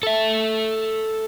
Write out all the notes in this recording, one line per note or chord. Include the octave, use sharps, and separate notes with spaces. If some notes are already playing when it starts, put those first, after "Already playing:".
A4 E5